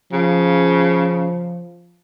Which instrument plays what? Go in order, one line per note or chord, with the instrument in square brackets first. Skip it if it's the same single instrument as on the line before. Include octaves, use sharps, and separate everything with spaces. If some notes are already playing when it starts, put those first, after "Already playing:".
[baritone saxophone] C#3 [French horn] F3